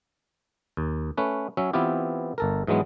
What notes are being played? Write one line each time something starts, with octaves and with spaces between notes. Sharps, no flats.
D#2
A3 C#4 B4
F#3 C#4 E5
E3 B3 C4 E4 F4 G4
G1 A4 A#4
G#2 E3 F#3 G#3 B3